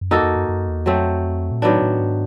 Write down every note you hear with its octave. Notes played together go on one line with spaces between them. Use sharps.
F#2
F2 A#3 D#4 F#4 A4
F2
F#2
F#2
E2
F2 F#3 A3 C4
A#2
A2 D#3 F#3 B3 D4
A2
G#2